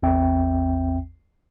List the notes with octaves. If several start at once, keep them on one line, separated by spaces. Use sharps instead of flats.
A1 E2 C4 E5 G5